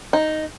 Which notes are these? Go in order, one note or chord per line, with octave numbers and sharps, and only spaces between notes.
D#4